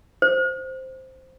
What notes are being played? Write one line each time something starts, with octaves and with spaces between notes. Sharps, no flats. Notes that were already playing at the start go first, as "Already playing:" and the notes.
C5